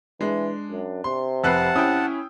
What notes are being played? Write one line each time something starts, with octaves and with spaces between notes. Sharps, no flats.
E3 G#3 D4
F#2
C3 C6
F1 B4 F#5 A5 E6 F#6 C7
C#4 E4 G5 D#6